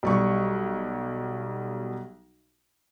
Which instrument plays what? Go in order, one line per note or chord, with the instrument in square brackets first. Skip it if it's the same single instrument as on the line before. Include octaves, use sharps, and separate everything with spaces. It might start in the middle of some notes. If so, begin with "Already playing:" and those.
[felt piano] B1 G3 C#6